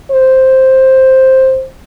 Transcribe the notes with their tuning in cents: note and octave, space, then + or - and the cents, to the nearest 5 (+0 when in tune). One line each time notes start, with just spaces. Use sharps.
C5 +5